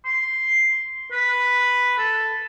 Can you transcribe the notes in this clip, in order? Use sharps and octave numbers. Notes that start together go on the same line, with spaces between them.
C6
B4
A4